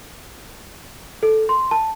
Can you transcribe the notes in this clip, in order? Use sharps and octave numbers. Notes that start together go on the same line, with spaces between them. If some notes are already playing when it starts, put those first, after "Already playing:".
A4
C6
A5